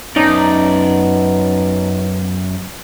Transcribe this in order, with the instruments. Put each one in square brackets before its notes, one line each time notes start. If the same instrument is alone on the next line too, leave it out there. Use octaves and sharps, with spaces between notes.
[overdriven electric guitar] F#2 D5 [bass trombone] B3 [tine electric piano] C#4 A5 A#5 [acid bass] D#4